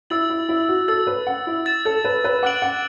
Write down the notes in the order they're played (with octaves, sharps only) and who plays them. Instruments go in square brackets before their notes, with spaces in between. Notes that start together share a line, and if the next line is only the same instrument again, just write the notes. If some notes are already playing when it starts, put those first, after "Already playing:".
[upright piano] E4 [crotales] E6 A6 F#7
[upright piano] E4
E4
F#4
[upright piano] A4 [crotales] E6 A6 F#7
[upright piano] B4
F#5
E4
[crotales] E6 A6 E7
[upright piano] A4
B4
B4
[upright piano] F#5 [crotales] D6 F#6 D7 F#7
[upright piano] F#5